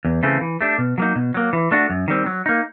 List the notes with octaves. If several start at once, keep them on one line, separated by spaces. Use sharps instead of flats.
E2
C#3 E3 A3 C4
E3
A3 D4 G4
B2
F#3 A#3 D#4
B2
F#3 A#3
E3
A3 D4 F#4
F#2
D#3 G3 C4
F#3
A#3 D#4